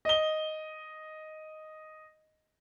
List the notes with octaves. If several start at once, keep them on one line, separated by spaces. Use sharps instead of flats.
D#5 G7